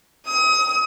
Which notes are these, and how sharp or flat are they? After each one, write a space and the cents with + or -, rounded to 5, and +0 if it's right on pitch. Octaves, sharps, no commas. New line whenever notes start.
D#6 +35